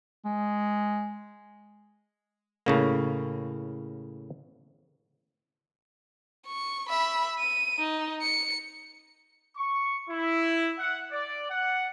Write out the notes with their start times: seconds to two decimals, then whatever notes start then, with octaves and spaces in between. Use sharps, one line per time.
0.25 G#3
2.66 A2 C#3 A#3
6.47 C#6
6.89 E5 B5
7.39 D#7
7.79 D#4
8.22 C#7
9.56 C#6
10.10 E4
10.79 F#5
11.11 D5
11.50 F#5